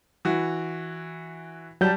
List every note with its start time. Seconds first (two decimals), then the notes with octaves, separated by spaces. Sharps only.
0.25 E3 F#4
1.81 F#3 G3 A5 G6